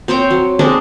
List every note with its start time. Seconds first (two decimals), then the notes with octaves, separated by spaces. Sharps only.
0.08 C4 C5 C#5 G5
0.30 F#3
0.59 G#3 C4 D4 D#4